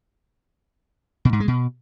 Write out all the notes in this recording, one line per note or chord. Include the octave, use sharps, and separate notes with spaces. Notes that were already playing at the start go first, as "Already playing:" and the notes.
B2
G#2
G#3
B2